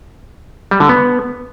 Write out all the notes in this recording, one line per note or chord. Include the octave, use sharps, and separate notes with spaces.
G3
D3
B3